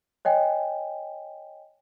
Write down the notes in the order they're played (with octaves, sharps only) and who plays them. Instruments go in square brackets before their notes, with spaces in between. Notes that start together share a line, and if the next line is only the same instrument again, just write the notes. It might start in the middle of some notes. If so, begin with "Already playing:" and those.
[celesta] C#5 D#5 G5 G#5